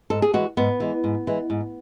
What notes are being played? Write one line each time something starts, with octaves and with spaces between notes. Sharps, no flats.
G#2 A4
G#4
E3 G#3 F#4
G#2 B3
E3 G#3
G#2
E3 G#3
G#2